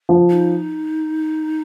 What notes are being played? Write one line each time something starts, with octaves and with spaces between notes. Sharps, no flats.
F3
D#4